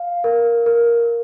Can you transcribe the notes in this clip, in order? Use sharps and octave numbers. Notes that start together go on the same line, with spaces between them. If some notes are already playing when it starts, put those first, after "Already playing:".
Already playing: F5
A#4
A#4